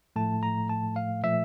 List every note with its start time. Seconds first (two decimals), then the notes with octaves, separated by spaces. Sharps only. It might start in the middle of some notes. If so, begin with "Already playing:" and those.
0.16 A2 F3 A3 A5
0.43 A#5
0.69 A5
0.96 F5
1.23 A#2 F3 A3 E5